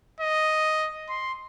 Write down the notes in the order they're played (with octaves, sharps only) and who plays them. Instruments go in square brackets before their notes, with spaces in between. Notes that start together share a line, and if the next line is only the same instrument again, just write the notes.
[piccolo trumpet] D#5
C6